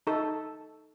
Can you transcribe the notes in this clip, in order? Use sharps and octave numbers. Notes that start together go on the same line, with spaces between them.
D#4 A4